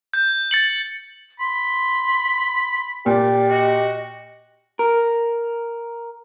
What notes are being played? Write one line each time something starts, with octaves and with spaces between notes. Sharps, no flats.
G6
A6 C#7 F#7
B5 C6
A#2 G4 D5
F#4 D#5
A#4